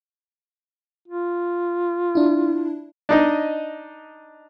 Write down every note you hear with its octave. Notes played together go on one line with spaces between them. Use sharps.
F4
D4 E4
D4 D#4 D#5